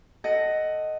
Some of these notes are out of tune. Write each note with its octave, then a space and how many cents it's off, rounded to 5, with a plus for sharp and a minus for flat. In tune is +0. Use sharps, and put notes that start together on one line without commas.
A4 +0 D#5 +0 F#5 +15